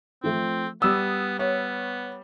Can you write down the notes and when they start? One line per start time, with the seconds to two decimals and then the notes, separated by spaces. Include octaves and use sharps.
0.24 F3 A3 C4
0.82 G3 B3 D#6 E6
1.39 B3 C#5